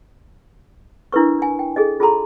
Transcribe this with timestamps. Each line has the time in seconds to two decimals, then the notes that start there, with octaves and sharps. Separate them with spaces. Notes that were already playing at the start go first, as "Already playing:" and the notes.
1.12 D4 E4 A#4 B4 C#6
1.39 D4 G#5
1.59 G5
1.76 G#4 A4 D#5
2.00 F4 G#4 A4 A5 A#5 C6